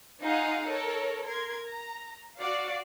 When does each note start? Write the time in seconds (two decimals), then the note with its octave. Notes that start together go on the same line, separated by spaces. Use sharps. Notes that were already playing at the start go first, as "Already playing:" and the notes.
0.22 D#4 F4 G#4 F5 F#5
0.66 A4 A#4 C#5
1.25 A#4 C6 G#6
1.65 A#5
2.38 F#4 D5 F5